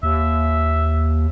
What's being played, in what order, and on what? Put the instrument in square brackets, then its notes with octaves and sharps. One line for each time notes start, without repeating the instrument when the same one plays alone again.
[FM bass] D#2 [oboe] E5